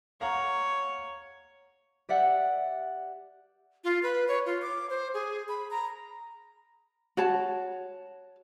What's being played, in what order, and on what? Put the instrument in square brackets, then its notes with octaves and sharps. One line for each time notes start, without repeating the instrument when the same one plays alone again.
[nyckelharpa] C#5 [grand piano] F5 F#5 A#5
[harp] G4 D5 E5 F#5
[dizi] F4
B4
C#5
F4
D6
C5
G#4
B5
A#5
[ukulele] F#4 C#5 A5